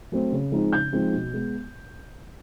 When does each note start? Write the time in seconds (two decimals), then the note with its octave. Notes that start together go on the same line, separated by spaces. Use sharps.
0.12 F#3 A3 C4
0.32 C#3
0.52 F3 G#3 C4 D#4
0.73 C#3 G6
0.92 F3 G#3 C4 D#4
1.13 B2
1.33 G#3 B3